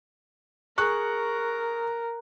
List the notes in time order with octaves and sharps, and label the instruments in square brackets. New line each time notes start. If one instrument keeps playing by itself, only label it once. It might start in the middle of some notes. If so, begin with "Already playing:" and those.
[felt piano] G#4 C#6 F#6 [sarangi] A#4